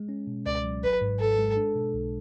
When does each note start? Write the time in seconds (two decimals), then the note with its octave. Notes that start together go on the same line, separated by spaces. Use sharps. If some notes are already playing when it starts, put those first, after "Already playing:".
Already playing: G#3
0.09 C#4
0.27 B2
0.46 C#2 D5
0.64 F#3
0.83 G#1 B4
1.01 G#2
1.19 G#1 A4
1.38 G#3
1.57 D4
1.75 B2
1.94 B1